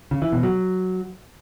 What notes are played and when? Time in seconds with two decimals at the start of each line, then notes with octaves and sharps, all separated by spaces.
0.11 C#3
0.22 E3
0.32 B2
0.43 F#3